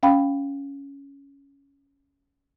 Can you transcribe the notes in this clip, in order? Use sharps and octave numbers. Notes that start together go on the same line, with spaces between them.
C#4 F5 G5 B5